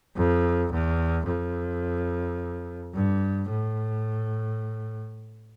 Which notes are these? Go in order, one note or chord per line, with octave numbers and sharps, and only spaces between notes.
F2
E2
F2
G2
A2